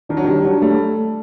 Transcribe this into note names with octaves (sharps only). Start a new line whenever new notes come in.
D#3 D4
F#3
D#3 G3
F#3 D4
G3 A3